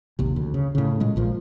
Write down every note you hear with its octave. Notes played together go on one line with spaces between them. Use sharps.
A#1 D#2 C3
D2
C#3
A2 C#3
A#2 G#3
A#1 A#2 F3